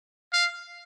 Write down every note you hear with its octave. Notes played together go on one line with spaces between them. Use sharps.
F5